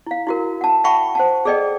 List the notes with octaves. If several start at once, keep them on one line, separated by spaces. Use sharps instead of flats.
E4 F5
E4 F#4 A#4
F#5 A5
E5 F#5 G5 A5 B5 C#6
C5 F#5 A5
G#4 A4 D5 D#5 G5